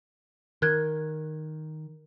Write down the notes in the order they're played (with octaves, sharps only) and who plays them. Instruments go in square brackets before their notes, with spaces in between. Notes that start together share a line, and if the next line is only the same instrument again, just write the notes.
[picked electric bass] D#3 [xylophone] A#4 F#6 G#6